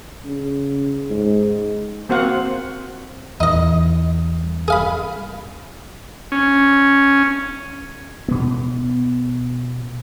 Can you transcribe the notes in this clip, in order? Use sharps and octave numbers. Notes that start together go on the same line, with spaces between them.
C#3
G#2
A#3 C4 F#4 C5 F5 F#5
E2 D#4 D#5
G#4 F5 B5
C#4
B2 B3